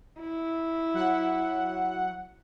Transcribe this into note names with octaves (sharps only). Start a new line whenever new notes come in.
E4
F#3 F#5